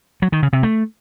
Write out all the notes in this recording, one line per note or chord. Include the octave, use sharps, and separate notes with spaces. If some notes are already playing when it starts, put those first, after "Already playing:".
F#3
D#3
C#3
C3
A3